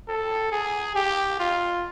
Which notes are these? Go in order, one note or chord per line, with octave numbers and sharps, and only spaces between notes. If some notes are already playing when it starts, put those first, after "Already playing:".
A4
G#4
G4
F4